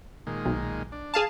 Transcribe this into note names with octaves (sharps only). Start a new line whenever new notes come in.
A#2 D#3 G#3
B1
D4
G#4 F5 A5